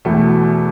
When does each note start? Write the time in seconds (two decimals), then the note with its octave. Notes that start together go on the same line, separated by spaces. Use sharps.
0.05 E2 B2 A3